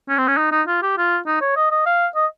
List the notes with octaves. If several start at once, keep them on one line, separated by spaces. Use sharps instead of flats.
C#4
C4
C#4
D#4
D#4
F4
G4
F4
D#4
C#5
D#5
D#5
F5
D#5